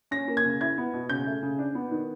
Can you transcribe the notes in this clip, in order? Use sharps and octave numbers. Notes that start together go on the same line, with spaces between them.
C#4 A#6
A#3
G#6
C#3
E4 G#6
B3
B2
C#3 G6
A3
C#3
D4
B3
D#3